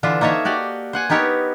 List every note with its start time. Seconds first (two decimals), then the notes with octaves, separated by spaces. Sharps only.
0.03 D3 E3 D4 F4 E5
0.21 A#3 D#4 A4 C#5 E5
0.45 F#4 G4 D5 D#5
0.93 C5 F#5 G#5
1.10 B3 D#4 G4 A#4 C#5